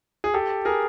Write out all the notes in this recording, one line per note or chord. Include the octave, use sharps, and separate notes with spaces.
G#4
G4 A4
G#4 A#4